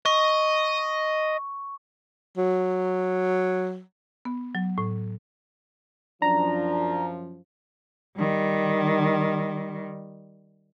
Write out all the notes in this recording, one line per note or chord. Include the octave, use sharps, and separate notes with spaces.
D#5 C#6
F#3
B3
F#3
A2
F#2 F3 D4 A#5
D#3 G3